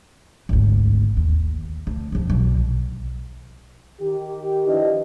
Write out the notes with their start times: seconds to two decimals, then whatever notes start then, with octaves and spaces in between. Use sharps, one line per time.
0.49 G#1 D2
1.17 D#2
1.87 D2
2.12 C2 F2
2.30 B1
4.00 D#3 G4
4.67 F3 D4 E4 B4 D#5